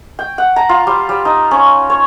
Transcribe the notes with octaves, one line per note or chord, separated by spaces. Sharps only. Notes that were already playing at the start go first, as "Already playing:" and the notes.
G5
F#5
A#5
F4
G3
G3
D#4
C#4
C#5